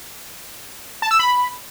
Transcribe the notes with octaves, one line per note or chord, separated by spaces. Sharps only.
A5
E6
B5